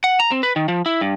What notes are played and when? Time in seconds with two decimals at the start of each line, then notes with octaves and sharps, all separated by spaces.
0.04 F#5
0.20 A#5
0.32 C4
0.43 B4
0.56 D#3
0.68 F3
0.86 E4
1.01 G2